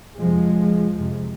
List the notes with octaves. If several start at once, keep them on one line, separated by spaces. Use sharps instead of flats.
F2 C3 F3 G#3
F2 C3